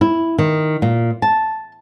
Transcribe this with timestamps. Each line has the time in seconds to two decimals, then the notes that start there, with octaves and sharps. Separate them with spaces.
0.01 E4
0.38 D#3
0.82 A#2
1.22 A5